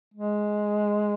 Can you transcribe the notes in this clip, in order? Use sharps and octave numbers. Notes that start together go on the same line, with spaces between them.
G#3